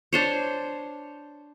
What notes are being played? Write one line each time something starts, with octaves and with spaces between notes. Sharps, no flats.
D4 C5 C#5